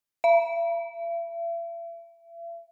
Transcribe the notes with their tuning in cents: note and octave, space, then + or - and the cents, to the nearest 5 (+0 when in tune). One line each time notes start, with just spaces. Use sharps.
E5 +40